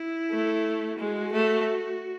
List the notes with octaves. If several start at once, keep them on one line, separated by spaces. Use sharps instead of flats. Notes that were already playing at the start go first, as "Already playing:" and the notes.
Already playing: E4
A3
G#3 F#4
A3